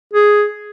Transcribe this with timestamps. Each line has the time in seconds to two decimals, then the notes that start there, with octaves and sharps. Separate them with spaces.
0.14 G#4